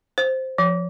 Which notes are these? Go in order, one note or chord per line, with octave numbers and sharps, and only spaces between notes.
C5
F3